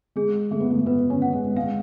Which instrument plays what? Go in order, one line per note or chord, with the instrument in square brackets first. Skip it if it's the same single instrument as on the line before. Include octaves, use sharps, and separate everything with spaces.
[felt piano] G#3 [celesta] G#4
[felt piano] A3 [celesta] G#4
[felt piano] B3
A3
[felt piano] B3 [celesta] B4
[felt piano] C#4
[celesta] F#5
[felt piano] G#3
[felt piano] G#3 [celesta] F5